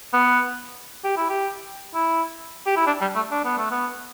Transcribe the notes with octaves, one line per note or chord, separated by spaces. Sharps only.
B3
G4
E4
G4
E4
G4
E4
D4
G3
A3
D4
B3
A3
B3